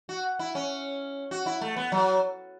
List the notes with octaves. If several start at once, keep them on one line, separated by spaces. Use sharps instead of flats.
F#4
E4
C#4
F#4
E4
A3
B3
F#3